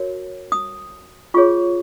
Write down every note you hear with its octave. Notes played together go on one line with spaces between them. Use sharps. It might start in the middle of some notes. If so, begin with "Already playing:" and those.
Already playing: F#4 A#4 C#5
D#6
F4 G#4 C#5 C#6